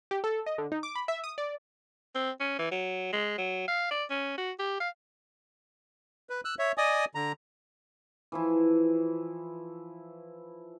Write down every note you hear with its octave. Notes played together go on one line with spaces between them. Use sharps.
G4
A4
D#5
D3
D#4
D6
B5
E5
D#6
D5
C4
C#4
E3
F#3
G#3
F#3
F5
D5
C#4
F#4
G4
F5
B4
E6 F#6
C#5 E5
D5 D#5 G#5 D#6
D3 A#5
E3 F3 E4